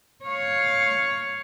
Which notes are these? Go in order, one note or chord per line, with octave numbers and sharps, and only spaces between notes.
C#5 F5